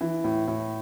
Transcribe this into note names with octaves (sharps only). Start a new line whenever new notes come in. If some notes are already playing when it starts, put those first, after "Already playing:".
E3
A2
A2